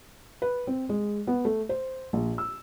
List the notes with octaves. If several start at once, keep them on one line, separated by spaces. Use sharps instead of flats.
B4
C4
G#3
B3
A3
C5
A#1
E6